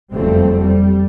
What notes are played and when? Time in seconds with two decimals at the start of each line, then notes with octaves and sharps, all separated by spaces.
0.13 F#1 F2 G3 A3 C4
0.58 G3